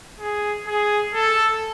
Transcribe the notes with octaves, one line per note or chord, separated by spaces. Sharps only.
G#4
G#4
A4